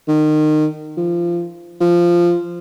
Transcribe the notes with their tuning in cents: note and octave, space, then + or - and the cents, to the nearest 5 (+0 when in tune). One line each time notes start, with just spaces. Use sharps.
D#3 -25
F3 -20
F3 -10